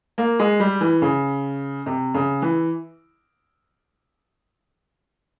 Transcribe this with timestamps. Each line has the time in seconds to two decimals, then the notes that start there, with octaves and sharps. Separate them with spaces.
0.18 A#3
0.39 G#3
0.60 G3
0.81 E3
1.02 C#3
1.86 C3
2.14 C#3
2.42 E3